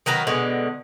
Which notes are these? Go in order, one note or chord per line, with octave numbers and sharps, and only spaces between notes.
D#3 F#3 A#4 B4
B2 D3 G#3